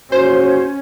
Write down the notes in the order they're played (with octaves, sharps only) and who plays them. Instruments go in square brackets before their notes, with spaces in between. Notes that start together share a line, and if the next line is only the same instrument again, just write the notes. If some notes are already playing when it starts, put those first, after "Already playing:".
[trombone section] A#1 E2 F#4 [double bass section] C#4 [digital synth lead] C5